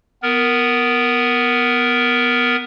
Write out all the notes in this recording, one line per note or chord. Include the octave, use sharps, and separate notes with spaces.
B3 A#4